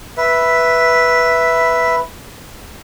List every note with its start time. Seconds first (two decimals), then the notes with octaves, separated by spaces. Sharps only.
0.17 B4 E5